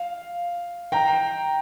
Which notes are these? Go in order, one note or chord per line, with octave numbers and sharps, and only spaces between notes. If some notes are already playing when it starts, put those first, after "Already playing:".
Already playing: F5
G5 A#5